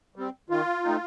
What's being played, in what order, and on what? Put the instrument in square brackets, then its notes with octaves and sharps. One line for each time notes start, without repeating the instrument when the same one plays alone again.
[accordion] G3 C4
D#3 F4
A3 C4 D#4